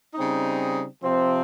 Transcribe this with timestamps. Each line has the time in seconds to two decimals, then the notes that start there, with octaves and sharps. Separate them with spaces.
0.15 C#3 G3 C4 D#4
1.02 C3 F3 C4